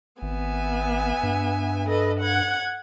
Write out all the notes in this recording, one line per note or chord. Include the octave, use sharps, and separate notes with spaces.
G#1 B3 E5 G#5
G2
A4 B4 D#5
F#5 G#6